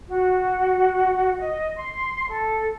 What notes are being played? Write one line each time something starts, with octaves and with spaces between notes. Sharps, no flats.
F#4
D#5
C6
A4